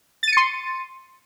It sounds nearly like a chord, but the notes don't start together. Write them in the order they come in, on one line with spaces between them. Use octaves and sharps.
A6 D#7 C#7 C6